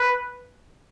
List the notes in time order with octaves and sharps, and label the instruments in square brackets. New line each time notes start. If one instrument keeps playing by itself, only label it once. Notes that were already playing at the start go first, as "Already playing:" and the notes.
Already playing: [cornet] B4